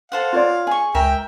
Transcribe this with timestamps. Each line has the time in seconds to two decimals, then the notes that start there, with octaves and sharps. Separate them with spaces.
0.12 A4 C5 F5 F#5
0.33 F4 C#5 D5
0.67 G#4 G#5 C#6
0.94 C#2 A#4 E5 G5